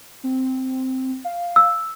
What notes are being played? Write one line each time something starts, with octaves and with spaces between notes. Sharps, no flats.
C4
F5
E6